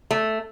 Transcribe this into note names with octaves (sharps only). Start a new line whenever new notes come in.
A3